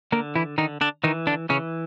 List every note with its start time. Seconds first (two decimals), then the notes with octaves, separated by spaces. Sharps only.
0.12 D3 A#3 A#4
0.35 E3 E4
0.58 D3 D#3 D#4
0.81 D3 D4
1.04 D#3 E3 D#4
1.27 D3 D4
1.49 C#3 E3 C#4